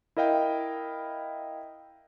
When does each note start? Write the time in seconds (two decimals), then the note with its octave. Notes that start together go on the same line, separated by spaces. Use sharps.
0.17 E4 A#4 D#5 F5 G5